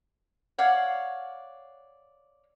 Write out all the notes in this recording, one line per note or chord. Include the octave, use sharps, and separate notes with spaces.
C#5 D5 F5 F#5